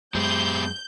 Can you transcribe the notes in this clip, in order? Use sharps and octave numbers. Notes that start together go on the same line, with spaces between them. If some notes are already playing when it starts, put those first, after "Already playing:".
F#2 G#3 B3 G4 C5 G6